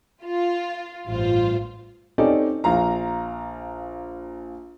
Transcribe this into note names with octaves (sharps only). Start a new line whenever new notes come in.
F4
A1 G2 F4 C5
C4 C#4 D#4 G4 A4 D5
A#1 F5 A#5